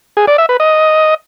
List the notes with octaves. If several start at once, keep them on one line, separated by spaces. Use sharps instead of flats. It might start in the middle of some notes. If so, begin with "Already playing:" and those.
G#4
D5
E5
B4
D#5